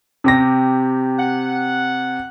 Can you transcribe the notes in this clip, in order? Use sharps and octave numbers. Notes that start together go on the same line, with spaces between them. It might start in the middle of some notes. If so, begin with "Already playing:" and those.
C3 G4 A#6
F#5